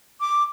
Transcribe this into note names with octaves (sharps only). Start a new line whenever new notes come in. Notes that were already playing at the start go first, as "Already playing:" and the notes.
D6